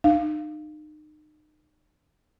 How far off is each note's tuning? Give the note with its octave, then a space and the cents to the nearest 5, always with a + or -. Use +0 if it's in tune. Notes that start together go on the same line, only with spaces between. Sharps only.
D#4 -35 F5 -15